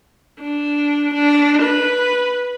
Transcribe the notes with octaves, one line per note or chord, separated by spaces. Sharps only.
D4
D4
B4